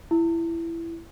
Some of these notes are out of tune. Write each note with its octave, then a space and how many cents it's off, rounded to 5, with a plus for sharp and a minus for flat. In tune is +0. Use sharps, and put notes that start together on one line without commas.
E4 +15